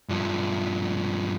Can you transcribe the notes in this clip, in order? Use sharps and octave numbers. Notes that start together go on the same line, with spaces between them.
G2 F3